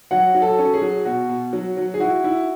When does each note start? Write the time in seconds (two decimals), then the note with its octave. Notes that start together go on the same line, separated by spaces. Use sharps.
0.11 F#3 F#5
0.35 F#3
0.42 A4
0.59 C#4
0.73 G#4
0.81 F#3
1.05 B2 F#4
1.29 B2
1.53 F#3
1.77 F#3
1.94 G#4
2.00 E4 F#4
2.24 E4